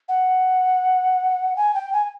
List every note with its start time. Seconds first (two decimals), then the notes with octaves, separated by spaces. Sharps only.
0.09 F#5
1.56 G#5
1.74 G5
1.93 G#5